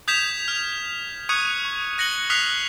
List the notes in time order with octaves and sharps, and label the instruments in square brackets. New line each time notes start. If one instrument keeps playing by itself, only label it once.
[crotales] D#6 G6 G#6 B6 E7 F7
F6 F7
C#6 D#6 F#6 G#6 C#7 D#7
C#6
F#6 A#6 C#7 F#7 G7
D#6 F6 F#6 B6 C7 F7